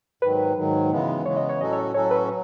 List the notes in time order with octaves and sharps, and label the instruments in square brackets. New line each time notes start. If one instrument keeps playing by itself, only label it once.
[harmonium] G#2 D#3 F#3 [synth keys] B4
[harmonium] G#2 D#3 F#3
C#3 E3 G#3 B3
[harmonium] C#3 E3 G#3 B3 [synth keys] C#5
[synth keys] D#5
C#5
[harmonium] A2 F#3 C#4 F#4 A4 [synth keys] D#5
[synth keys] C#5
[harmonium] A2 F#3 C#4 F#4 A4 [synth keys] C#5
[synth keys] B4
[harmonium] F#3